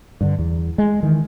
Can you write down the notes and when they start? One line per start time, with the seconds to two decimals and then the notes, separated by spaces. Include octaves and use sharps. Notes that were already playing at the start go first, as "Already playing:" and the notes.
0.21 G2 D3
0.39 E2
0.78 G#3
1.03 D#3 E3